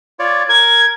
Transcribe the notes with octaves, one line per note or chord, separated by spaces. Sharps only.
F4 C#5 D5
A#4 G#6